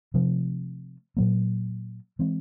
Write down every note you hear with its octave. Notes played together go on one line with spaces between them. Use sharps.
C3 F3 A3
A#2 F#3 A#3
E3 G#3 C4